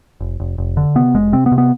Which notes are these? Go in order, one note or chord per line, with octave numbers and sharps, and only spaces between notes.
F1
F1
F1
D3
C3 B3
F1 G#3
C3 C4
B3
C3
B3